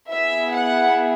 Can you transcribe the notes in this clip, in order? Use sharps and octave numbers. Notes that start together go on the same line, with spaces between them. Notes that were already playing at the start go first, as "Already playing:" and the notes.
B3 E4 G#4 E5
F#5